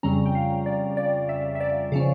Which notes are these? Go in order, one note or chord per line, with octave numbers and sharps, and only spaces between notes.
F2 C#3 G3 C#4 A#5
G5
F5
D5
D5
E5
E5
D5
C#3 F3 C#4